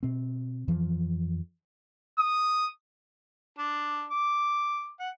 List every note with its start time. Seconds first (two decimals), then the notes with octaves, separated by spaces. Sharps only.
0.03 B2 C4
0.68 F2 E3 F3
2.19 D#6
3.58 D4
4.11 D6
5.00 F#5